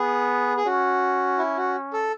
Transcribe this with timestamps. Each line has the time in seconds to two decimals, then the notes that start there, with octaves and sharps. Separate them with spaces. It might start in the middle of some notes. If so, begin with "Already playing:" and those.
Already playing: B3 G#4
0.57 G#4
0.65 C#4 F#4
1.38 E4
1.57 F#4
1.93 A4